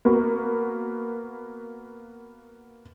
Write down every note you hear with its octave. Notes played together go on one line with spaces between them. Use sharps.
A#3 B3 F#4